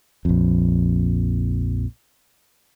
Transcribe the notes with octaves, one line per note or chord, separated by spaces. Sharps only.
A#1 F2